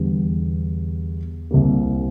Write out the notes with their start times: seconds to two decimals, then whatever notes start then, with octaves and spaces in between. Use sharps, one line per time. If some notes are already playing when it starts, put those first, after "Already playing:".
Already playing: E2 D3 G3
1.51 C2 C3 G3 A#3